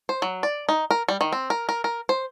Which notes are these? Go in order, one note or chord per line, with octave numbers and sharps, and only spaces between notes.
C5
F#3
D5
D#4
A#4
G3
D#3
C4
A#4
A#4
A#4
C5